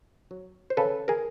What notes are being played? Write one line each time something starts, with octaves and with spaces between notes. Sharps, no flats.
F#3
C5
C#3 A4 B4
G#4 A#4